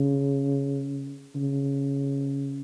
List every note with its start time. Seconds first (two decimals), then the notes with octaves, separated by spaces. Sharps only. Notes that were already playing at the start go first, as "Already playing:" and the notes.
Already playing: C#3
1.35 C#3